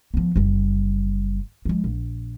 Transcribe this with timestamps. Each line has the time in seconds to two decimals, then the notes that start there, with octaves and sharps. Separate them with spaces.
0.14 F3 B3
0.36 F#1 G3
1.65 F3 G#3
1.84 A#1